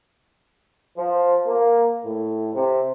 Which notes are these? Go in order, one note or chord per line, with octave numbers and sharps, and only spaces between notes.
F3
A#3
A2
C3